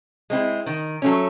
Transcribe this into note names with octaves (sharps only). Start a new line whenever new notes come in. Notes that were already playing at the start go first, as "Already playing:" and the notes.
G#3 C4 E4
D#3
F#3 A3 C#4